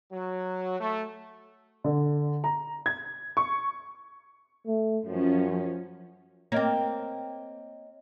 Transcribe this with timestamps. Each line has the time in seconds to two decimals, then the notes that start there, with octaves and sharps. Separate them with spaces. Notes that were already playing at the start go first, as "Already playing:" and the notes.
0.10 F#3
0.79 A3
1.84 D3
2.44 A#5
2.86 G#6
3.37 C#6
4.67 A3
5.06 F#2 F3 C#4
6.52 A#3 C4 C#5 D#5